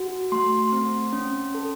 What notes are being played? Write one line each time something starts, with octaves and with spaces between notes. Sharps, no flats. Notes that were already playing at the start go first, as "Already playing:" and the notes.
Already playing: F#4
A3 C6
C4
C#4
A4